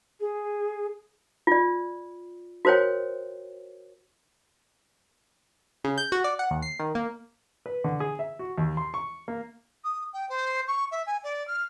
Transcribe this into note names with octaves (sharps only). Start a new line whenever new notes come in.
G#4
F4 D5
F#4 A#4 C5 C#5 G5
C#3
G6
F#4
D5
F#5
D#2
C7
D#3
A#3
B4
D3
G#4
E5
F#4
D#2
C6
C#6
A#3
D#6
G5
C5
C#6
E5
G#5
D5
F6